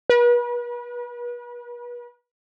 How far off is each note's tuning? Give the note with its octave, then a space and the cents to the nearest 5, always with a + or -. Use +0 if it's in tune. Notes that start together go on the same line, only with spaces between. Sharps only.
B4 -40